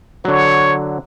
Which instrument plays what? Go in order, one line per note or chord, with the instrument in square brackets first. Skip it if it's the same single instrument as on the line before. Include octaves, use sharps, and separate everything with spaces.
[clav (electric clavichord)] D3 F#3 [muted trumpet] C#5